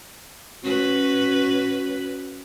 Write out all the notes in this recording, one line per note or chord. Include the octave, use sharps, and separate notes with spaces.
C#4 F#4 B4